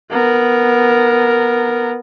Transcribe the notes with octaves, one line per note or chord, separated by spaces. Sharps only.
B3 A#4